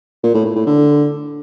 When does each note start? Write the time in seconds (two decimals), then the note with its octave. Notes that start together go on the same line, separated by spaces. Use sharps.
0.23 A#2
0.34 A2
0.45 A2
0.56 A2
0.66 D3